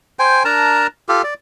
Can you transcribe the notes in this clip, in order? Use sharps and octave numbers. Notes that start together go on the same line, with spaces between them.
C5 G5 G#5
D4 A#4 A5 A#5
F4 G4 A4
D5